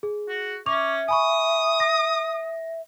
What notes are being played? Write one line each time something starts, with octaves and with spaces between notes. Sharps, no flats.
G#4
F#4
C#4 E5 C#6 D6 F7
G#5 B5 C#6 D#6
A#6